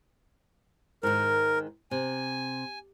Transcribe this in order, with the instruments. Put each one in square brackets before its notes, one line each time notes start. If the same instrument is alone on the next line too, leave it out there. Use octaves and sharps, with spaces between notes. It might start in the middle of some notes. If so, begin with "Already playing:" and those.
[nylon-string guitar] G#2 D#3 [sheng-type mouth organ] A#4
[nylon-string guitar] C3 [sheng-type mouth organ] G#5